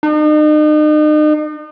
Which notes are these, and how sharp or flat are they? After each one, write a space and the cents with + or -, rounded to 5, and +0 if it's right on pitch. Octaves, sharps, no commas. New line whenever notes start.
D#4 -40